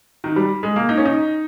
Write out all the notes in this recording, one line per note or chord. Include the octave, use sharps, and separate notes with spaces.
D#3
G3
G#3
A#3
D#4
C#4
D#4